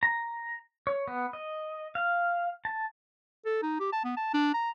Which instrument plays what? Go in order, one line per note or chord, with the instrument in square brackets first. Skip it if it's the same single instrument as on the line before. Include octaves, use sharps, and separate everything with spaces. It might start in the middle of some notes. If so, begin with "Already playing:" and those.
[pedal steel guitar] A#5
C#5
B3
D#5
F5
A5
[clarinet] A4
D#4
G4
A5
B3
A5
D4
A#5